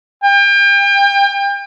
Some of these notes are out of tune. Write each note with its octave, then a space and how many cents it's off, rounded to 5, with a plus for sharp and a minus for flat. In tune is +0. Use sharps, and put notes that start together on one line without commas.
G5 +35